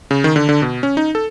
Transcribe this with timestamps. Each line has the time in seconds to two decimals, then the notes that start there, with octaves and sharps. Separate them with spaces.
0.11 C#3
0.24 D#3
0.36 D3
0.49 D3
0.62 B2
0.83 C#4
0.97 D#4
1.15 A4